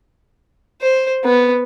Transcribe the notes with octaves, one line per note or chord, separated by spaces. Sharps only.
C5
B3